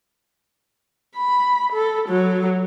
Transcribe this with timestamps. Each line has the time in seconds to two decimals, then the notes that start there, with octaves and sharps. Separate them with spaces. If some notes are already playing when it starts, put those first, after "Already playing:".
1.16 B5
1.73 A4
2.09 F#3